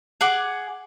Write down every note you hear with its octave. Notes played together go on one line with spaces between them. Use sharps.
G#4 F#5 D6